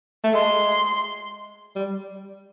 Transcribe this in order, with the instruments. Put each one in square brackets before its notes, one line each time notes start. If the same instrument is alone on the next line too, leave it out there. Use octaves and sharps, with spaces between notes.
[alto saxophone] A3
[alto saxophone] G#3 [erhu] C6
[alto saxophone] G3